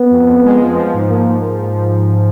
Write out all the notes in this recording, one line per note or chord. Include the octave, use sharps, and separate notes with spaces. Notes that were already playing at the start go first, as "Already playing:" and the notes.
Already playing: B3
F2
F2
G#3
F3
F3
G#2
G#2 A#3